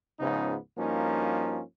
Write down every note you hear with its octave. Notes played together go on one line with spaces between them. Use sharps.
C#2 G#2 C#3 F3 B3 D#4
G2 F3 A#3 C#4 D#4 F#4